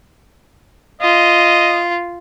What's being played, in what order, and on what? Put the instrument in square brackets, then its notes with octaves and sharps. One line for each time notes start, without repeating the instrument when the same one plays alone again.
[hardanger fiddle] F4 [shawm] D#5